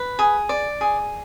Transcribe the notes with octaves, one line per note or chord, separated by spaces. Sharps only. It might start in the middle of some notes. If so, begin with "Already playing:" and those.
Already playing: B4
G#4
D5
G#4